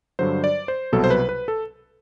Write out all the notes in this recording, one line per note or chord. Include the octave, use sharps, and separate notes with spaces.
G2 D3 F#3 C5
D5
C5
C2 B2 F#3 A4
C5
B4
B4
A4